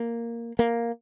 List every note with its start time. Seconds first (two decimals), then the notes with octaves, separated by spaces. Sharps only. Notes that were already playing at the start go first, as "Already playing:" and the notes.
Already playing: A#3
0.59 A#3